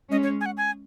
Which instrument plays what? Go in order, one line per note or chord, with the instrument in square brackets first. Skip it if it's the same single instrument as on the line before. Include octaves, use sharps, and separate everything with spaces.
[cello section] G#3 C#4 [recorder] D#5
[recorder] C#5
G#5
F#5
G#5